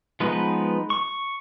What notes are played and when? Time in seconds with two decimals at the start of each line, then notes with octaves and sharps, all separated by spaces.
0.20 F3 G#3 B3 D#4 B4
0.90 C#6